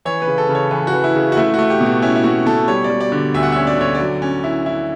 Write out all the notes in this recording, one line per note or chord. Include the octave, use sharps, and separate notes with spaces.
E3 C#5
B4
C#3
A4
C#3
C#5
E3 B4
F#4
E3
E4
C#3
F#4
A3 E4
A3 F#4
G4
B2
F#4
C#4 E4
E4
B2 F#4
B2 A4
G3 C#5
D5
G3
D5
D3
D2 E5
F#5
C#4 E5
D5
D3 C#5
D5
F#3
C#4
E4
E4